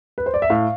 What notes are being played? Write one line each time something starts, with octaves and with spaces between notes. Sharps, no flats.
B4
C5
D5
E5
A2 F5